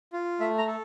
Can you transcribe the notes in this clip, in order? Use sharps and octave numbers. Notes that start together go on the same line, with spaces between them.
F4
A3 E5
A#5
A4